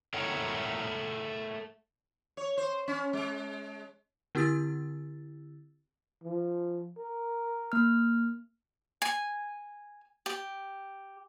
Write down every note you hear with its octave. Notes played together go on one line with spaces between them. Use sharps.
A3 A4 A#4 C#5 F#5 G5
C#5
C5
C#4
G#3
D3 C4 E4 G4 E6 A6
F3
A#4
A#3 F6
G#5
G4